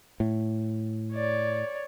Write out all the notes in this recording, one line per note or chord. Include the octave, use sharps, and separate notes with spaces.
A2
C#5 D5